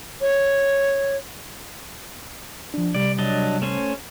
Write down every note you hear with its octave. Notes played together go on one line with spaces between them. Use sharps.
C#5
F3 D4
C3 G3 D5
F#3 D4 D#5
A3 C#4 C5